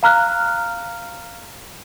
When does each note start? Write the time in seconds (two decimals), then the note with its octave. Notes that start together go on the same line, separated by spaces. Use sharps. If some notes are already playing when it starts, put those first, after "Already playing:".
0.03 F5 A#5 F6 F#6